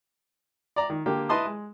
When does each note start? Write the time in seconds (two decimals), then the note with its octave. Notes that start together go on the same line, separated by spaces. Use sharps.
0.76 D5 A#5
0.90 D#3
1.06 D3 A#3 G4
1.29 E4 B4 D#5 A5 C6 D#6
1.45 G#3